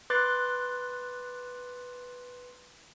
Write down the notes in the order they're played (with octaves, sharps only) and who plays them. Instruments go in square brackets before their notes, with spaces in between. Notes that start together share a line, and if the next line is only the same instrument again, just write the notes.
[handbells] B4 C6 D6 F#6 A6